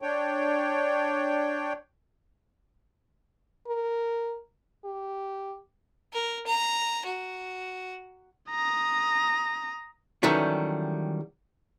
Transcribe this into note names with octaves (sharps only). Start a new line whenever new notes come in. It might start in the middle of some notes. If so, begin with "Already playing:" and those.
D4 C#5 G5
A#4
G4
A#4
A#5
F#4
A#5 D#6
D#3 E3 F#3 G3 A3 C#4